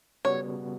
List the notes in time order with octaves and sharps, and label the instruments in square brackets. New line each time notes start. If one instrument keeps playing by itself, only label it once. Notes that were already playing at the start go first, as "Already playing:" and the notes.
[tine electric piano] C#3 G3 B3 F#4 [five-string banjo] C#5